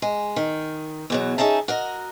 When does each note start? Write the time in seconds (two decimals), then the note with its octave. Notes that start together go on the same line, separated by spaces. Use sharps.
0.02 G#3
0.36 D#3
1.10 E2 B2 F#3
1.38 C#4 D#4 G#4 E5 A5
1.68 F#4 A#4 D#5